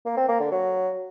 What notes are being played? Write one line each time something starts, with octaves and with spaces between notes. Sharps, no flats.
A#3
C4
A#3
D3
F#3